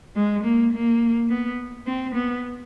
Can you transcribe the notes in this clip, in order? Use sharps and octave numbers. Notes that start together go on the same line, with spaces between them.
G#3
A#3
A#3
B3
C4
B3